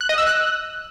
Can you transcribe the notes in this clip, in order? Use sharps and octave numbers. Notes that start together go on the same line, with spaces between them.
F#6
D#5
E6
F#6